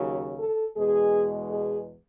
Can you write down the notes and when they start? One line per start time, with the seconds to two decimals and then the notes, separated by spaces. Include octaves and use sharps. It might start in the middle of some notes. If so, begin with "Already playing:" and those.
Already playing: D#2 C#3 F#3
0.39 A4
0.76 E2 B2 G#3 G#4
1.50 G#4